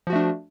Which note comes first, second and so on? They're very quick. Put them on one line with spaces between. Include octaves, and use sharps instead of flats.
F3 F#4 A3 D4